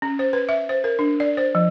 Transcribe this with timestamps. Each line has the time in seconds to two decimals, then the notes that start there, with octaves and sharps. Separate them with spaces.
0.02 C#4
0.19 C5
0.33 B4
0.49 E5
0.69 C5
0.84 A#4
0.99 D4
1.20 D5
1.37 C5
1.55 F3